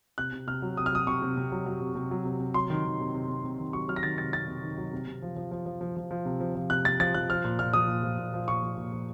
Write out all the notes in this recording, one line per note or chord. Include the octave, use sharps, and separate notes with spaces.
C3 F#6
C3
C3 F6
F#3
C3 D#6
F6
F#3 D#6
C3 C#6
C3
C3
F#3
F#3
C3
C3
F#3
C3
C3
F#3 C6
D#3
D#3
C3
C3
C3
C3
D#3
F#3 C#6
F#3 F6
A#6
D#3 A6
C3 A6
C3 A6
C3
D#3
F#3
C3
C3
F3
F3
F3
F3
F3
F3
F3
C3
F3
F3
C3 F#6
C3 A6
F3 A6
F3 F#6
F3 F6
A#2
A#2 F6
F3 D#6
A#2
F3
A#2
F3
A#2 C#6
F3
A#2
F3